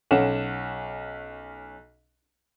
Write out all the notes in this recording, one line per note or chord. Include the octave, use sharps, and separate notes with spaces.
B1 C#4 F#5 E7